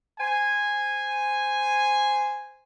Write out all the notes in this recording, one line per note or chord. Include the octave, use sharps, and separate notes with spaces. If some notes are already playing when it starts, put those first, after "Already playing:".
C5 G#5